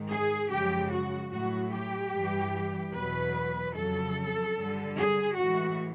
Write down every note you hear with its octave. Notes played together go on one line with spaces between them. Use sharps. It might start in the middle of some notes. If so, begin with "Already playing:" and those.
Already playing: G#2 D#3 G#3
G#4
F#2 C#3 F3 G#3 G4
F#4
A2 F#3 F#4
G4
G2 E3 G3
E2 B2 F#3 B4
F2 C#3 F#3 A4
G2 D3 G3
G#4
A2 E3 G#3 F#4